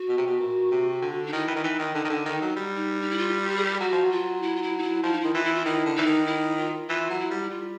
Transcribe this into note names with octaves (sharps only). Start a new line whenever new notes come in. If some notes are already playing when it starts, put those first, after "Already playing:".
Already playing: F#4
B2
C3
B2
A#2
C3
D3
D#4
D#3 E4
E3
D#3
E3 D#4
D#3
D3 D#4
D#3
D3
D#3 D#4
F#3
G3
D#4
D#4
E4
F4
G4
G#4
G4
F#3 F#4
F3
F#3
F4
E4
F4
E4
D#4
E4
F3 E4
D#4
D#3 E4
E3 F4
E4
F4
D#3 E4
D3
E3 D#4
D#3
E4
F4
E3 F4
F#3
E4
G3
E4
G3 F4